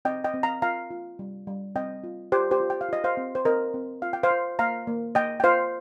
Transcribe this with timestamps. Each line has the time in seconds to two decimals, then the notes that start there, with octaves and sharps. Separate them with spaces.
0.05 C4 D#5 G5
0.24 D#5 G5
0.34 C4
0.43 F5 A#5
0.62 F4 F5 A#5
0.91 F4
1.19 G3
1.47 G3
1.76 C4 D#5 G5
2.04 F4
2.32 F4 G4 C5
2.51 G4 C5
2.60 F4
2.70 G5
2.81 F5
2.89 F4 D#5
3.04 C5 F5
3.17 C4
3.35 C5
3.45 C4 A#4 D#5
3.74 C4
4.02 F4 F5
4.13 G5
4.23 C5 F5
4.31 F4
4.59 A#3 F5 A#5
4.87 A#3
5.15 A#3 D#5 G5
5.40 G5
5.44 F4 C5 F5